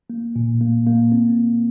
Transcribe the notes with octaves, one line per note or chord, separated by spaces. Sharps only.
A#3
A#2
A#3
A#3
C4